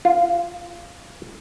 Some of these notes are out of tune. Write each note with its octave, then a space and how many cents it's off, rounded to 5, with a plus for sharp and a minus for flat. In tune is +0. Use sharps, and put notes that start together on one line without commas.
F4 -15